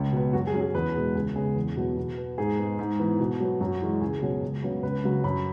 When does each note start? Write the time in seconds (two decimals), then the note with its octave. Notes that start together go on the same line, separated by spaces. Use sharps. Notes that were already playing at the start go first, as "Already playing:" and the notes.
Already playing: C#2
0.13 B2 B3
0.33 F#2 F#4
0.47 G#4
0.54 F#3 C#4
0.61 G#4
0.74 E2 B4
0.95 B2 G#3 B3
1.15 C#2 G#4
1.36 C#3 G#3 B3 G#4
1.56 E2
1.77 B2 F#3 B3
1.97 B2
2.17 B3
2.38 G#2 G#4
2.58 G#3 B3
2.79 G#2
3.00 E3 B3
3.20 B2
3.40 F#3 B3
3.60 F#2 F#4
3.82 E3 G#3
4.01 C#2 G#4
4.22 B2 F#3 C#4
4.42 C#2
4.63 C#3 F#3 B3
4.83 C#2 B4
5.04 C#3 F#3
5.24 F#2 B5